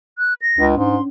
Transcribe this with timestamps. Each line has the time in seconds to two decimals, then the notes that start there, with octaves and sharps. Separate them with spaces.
0.18 F#6
0.42 A#6
0.58 C#2 D4
0.77 G#2 C#4 C6